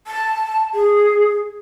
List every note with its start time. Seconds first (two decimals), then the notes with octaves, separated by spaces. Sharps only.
0.07 A5
0.74 G#4